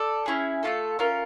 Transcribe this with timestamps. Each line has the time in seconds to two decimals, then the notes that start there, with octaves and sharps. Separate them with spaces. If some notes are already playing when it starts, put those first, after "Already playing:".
Already playing: A4 D5
0.26 C#4 E4 G#4
0.63 A3 C#4 F4 A4
0.99 C#4 F4 A#4